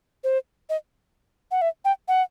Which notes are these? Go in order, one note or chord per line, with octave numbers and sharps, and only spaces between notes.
C5
D#5
F#5
E5
G5
F#5